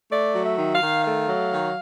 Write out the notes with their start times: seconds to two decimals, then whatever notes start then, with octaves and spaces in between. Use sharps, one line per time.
0.11 A3 D5
0.35 F#3
0.43 E5
0.58 D#3
0.74 F5
0.82 D#3
1.05 A3 F5
1.28 F#3
1.52 D#3